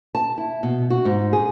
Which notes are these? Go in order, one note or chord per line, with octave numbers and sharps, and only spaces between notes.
A5
E4
B2
F#4
G#2
G#4